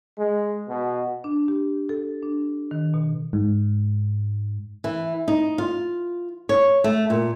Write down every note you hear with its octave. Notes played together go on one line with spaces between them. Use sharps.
G#3
B2
D4
G4
A4
D4
D#3
B2
G#2
E3
D#4
F4
C#5
A3
A#2